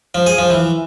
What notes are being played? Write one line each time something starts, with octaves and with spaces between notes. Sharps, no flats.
F3
G#4
F3
E3